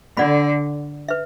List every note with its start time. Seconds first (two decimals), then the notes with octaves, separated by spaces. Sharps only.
0.17 D3 A4 D5 F#5 B5
1.08 B4 E5